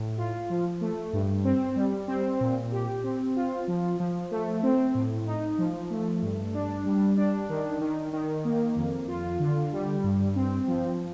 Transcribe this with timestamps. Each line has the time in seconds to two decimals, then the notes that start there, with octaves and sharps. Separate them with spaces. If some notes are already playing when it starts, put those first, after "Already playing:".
Already playing: A2
0.18 F4
0.50 F3
0.81 A3
1.13 G2
1.45 C4
1.76 G3
2.08 C4
2.41 A#2
2.72 G4
3.04 C4
3.36 F4
3.68 F3
4.00 F3
4.31 A3
4.63 C4
4.95 A2
5.26 D#4
5.58 F3
5.90 A3
6.23 G2
6.54 D4
6.85 G3
7.18 D4
7.49 D#3
7.81 D#3
8.13 D#3
8.45 A#3
8.77 F2
9.08 F4
9.40 D3
9.73 G3
10.04 G2
10.36 C4
10.67 F3